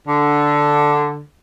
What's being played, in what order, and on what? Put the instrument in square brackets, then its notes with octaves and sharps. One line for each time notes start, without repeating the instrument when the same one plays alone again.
[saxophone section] D3